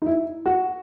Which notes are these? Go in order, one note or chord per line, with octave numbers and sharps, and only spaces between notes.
D#4
E4
F#4